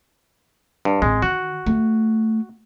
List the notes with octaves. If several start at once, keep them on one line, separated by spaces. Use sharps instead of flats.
G2
A1 G#3 C4
D#3 F#4
A3